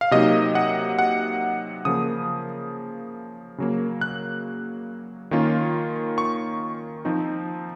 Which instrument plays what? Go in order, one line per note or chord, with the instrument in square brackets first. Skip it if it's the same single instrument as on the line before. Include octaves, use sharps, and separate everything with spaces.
[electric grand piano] F5
C3 F#3 A#3 D#4 D#5
F#5
F#5
C#3 F3 A#3 D#6
C#3 F#3 A#3
F#6
D#3 A#3 C#4 F4
C#6
F3 C4 D#4